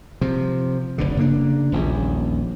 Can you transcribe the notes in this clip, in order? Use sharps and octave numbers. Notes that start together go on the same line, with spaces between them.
C3 F3
F1 G2 D3
C#3 A#3 C4 D4
D#1 A#1 E2